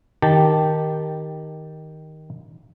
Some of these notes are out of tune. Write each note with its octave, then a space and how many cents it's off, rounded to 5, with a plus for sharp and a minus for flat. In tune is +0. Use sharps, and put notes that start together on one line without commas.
D#3 +0 G4 +0 A5 +0